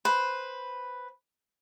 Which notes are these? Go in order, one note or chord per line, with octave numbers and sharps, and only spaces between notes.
B4 C5